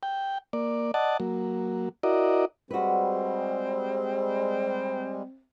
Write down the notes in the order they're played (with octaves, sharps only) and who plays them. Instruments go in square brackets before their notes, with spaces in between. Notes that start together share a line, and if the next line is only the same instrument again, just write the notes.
[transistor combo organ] G5
A#3 D5
D5 D#5 F#5 A5
F#3 A#3
E4 F#4 A#4 D5 D#5
[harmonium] G3 G#3 [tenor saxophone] C4 [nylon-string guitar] F#4 B4